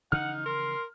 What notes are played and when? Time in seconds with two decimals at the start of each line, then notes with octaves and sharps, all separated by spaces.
0.12 C#3 E3 F3 D#4 F#5 F6
0.46 A#4 C6